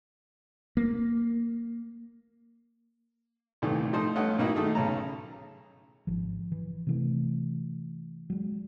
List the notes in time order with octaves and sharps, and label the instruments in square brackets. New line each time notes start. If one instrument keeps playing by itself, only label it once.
[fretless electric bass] A#3
[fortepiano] C2 A#2 D#3 E3 A3
F3 A3 D#4 C5
G2 A3 C#4 D#5 F#5
B1 A#3 D#4 E4 F#4
D#3 A3 D#4 G#4
B1 C#3 C#4 A5 A#5
[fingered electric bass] G#1 F3
E3
C3 E3 A3
F#3 G#3